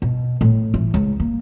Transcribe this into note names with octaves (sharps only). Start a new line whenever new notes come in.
B2
A2
E3
C#2
A#3